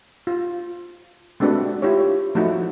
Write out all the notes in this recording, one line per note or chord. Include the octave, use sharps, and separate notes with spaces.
F4
G#3 A3 C4 D4 F#4 B4
E4 F4 G4 C#5
F3 A3 D#4 E4 F#4